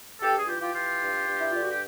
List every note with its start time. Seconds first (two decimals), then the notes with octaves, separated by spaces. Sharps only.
0.20 G2 G4 A4
0.37 G#4
0.46 E3 F4 G4
0.60 F4 G4
0.73 E3 F4 G4
1.01 G2
1.27 G2
1.39 E4
1.49 D3 F4
1.60 F#4
1.70 G4